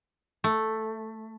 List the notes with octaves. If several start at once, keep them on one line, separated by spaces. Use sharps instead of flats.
A3